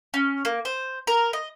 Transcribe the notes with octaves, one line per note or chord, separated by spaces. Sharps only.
C#4
A#3
C5
A#4
D#5